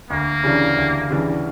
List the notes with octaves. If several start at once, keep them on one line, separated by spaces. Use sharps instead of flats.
D2 A#3
C#3 E3 G3 D4
D2
C#3 E3 G3 D4